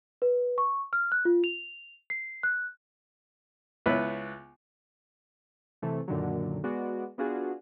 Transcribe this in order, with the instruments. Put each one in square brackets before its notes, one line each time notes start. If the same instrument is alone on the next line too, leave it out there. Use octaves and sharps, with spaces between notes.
[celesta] B4
C#6
F6
F#6
F4
F7
C7
F#6
[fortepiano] C#2 B3 E4 B4 F#6
[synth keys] C3 E3 A3
F#2 A#2 D3 D#3 F#3
G#3 B3 F#4 D5
B3 D4 F4 F#4 G#4